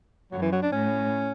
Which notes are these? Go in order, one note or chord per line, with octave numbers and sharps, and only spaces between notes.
F#2 F#3
E3
F#3
D4
A2 C#4